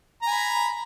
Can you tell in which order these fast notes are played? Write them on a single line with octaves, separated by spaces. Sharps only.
A#5 G#5 B5